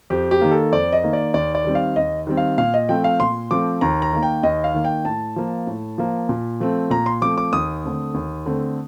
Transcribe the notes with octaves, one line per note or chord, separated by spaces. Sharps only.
F2 G4
G4
D#3 A#3
A4
F2 D5
D#5
D#3 A#3
D5
D#2 D5
D5
D#3 G3 C4
F5
D#2 D#5
D#3 G3 C4
F5
A#2 F5
D#5
F3 A3 C4 G5
F5
A#2 C6
F3 A3 C4 D6
D#2 A#5
A#5
D#3 A#3
G5
D#2 D#5
F5
D#3 A#3
G5
A2 A5
F3 A#3
A2
F3 A#3
A#2
F3 A3 C4
A#2 A#5
C6
F3 A3 C4 D6
D6
D#2 D#6
D3 A3 C4
D#2
D3 A3 C4